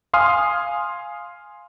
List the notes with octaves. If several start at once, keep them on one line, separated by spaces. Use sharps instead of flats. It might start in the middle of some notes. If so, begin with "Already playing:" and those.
F5 G#5 C6 D#6 F6